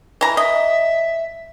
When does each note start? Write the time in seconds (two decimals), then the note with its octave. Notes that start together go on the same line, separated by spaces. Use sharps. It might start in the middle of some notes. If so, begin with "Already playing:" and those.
0.21 E3 A#5
0.37 D#5 E5